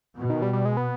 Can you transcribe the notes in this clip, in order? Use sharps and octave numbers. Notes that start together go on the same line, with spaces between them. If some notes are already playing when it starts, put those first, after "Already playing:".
B2
D#3
G3
G3
G#3
B3